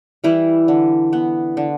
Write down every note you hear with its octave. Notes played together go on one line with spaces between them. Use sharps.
E3 G3 E4
D3
B3
D3